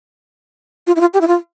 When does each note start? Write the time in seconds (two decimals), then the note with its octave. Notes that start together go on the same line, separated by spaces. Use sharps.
0.87 F4
0.96 E4
1.00 F4
1.14 G4
1.21 E4
1.27 F4